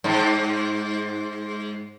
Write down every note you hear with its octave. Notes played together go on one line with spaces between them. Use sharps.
G#2